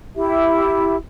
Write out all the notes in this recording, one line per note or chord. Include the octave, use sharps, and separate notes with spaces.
E4 G4 E5